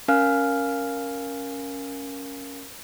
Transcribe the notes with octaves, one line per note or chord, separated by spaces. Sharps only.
C#4 A#4 F5 G#5 F6